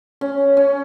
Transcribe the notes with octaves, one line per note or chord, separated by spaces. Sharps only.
C#4
C#4